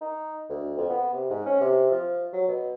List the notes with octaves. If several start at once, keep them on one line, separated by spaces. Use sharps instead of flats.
D#4
D2
F2
B3
C3
G#2
C#4
C3
F3
F#3
B2